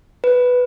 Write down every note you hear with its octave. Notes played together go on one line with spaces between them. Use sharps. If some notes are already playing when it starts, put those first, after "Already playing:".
B4